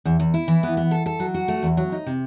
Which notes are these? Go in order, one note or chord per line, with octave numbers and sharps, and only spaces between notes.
E2
E2
E4
E3
B3
B3
A4
A4
F#3
F#4
A3
E2
F#3
D#4
C3